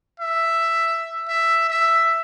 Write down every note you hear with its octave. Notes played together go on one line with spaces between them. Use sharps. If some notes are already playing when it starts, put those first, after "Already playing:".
E5
E5
E5